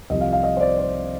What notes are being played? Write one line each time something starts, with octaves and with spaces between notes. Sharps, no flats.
C2 C3 F3 D#5
F5
F5
D#5
C5
D5
C5